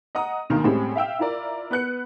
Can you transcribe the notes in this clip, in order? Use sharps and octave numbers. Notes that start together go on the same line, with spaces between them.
D#5 F#5 A#5 D#6
D2 B2 D#3 A#3
A2 G3 G#3 C4 C#4
E5 F5 G5 E6
E4 F4 A#4 D5
B3 B4 F#6 C#7